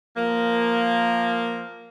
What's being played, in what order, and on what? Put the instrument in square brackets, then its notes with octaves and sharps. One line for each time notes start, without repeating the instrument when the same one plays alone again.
[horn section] F3 A#3